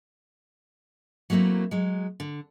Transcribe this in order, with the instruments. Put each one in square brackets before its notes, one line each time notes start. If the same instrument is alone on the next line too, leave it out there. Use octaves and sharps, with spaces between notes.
[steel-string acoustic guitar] F#3 A3 A#3 C4 E4
F#3 G#3
D3